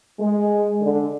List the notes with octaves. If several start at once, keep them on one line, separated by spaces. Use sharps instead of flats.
G#3
D3